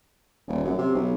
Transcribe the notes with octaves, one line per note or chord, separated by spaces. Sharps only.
D#1
F#2
C3
B1